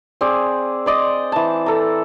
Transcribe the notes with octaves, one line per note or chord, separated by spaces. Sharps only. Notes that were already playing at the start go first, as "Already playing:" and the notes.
C4 G#4 D5
C5 D5 D#5
E3 A5
A4 A#5